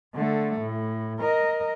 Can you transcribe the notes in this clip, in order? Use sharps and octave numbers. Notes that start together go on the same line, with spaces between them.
D3 A3
A2
A#4 D#5